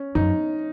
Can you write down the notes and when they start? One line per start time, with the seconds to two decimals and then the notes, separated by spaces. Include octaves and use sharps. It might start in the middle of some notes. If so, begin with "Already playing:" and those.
Already playing: C#4
0.15 F#2 D#4